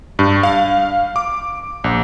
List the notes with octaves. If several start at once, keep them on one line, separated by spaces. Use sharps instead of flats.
G2
F5
D6
A#1